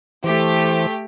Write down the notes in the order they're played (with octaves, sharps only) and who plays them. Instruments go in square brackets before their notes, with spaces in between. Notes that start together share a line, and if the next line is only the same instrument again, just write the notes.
[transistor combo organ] E3 C5 [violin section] A3 G4